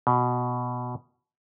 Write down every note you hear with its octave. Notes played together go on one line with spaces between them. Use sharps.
B2